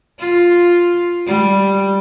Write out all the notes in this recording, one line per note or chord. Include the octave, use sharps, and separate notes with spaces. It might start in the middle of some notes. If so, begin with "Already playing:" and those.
F4
G3